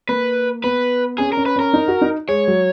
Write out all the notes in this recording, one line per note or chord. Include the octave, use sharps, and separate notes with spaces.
A#3 B4
B3 B4
C#4 G#4
A#4
C#4
B4
C#4 A#4
D#4
F#4
D#4
G#3 C#5
F#3